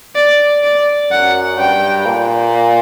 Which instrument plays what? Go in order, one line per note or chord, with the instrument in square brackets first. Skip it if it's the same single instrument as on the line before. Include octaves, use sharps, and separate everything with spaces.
[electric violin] D5
D5
[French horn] F#2 [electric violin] F#5
[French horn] G2 [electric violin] G5
[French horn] A#2